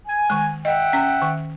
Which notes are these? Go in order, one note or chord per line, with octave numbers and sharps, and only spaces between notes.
G#5
D#3 G#3
D#5 E5 F#5 G5
C#4
D#3